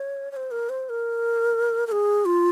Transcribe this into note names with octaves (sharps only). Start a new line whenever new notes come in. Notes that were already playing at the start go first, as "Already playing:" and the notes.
Already playing: C#5
C#5
C5
A#4
C5
A#4
A#4
G#4
F4